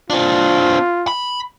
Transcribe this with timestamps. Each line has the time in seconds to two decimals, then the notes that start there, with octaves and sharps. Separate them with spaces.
0.10 C4 D4 F4
1.08 B5